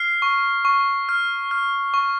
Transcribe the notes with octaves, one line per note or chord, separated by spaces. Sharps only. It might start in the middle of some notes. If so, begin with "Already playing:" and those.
Already playing: F6 C7
C#6
C#6
F6
F6
C#6